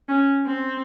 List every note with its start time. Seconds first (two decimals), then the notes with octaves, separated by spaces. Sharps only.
0.08 C#4
0.47 C4